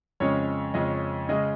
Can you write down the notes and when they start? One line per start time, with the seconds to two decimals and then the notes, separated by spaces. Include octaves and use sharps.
0.20 F2 C#3 G#3 C#4 C#5
0.74 F2 C#3 G#3 C#4 D#5
1.29 C#3 G#3 C#4 D#5